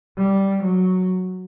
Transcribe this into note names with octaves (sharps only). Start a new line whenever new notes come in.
G3
F#3